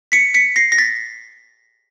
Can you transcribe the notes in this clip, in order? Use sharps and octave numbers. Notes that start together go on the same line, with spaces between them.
B6 C#7
B6 C#7
A#6 C7
A#6
A6 B6